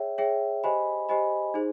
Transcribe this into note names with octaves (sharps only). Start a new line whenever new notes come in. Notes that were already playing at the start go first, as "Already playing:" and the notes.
Already playing: G#4 C#5 E5 G5
G#4 C#5 E5 G5
G4 C5 D#5 G#5 B5
G4 C5 D#5 G#5 B5
D#4 G#4 C5